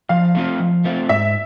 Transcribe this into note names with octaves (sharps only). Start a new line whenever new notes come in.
F3 F5
A3 C4 F4
F3
A3 C4 F4
G#2 E5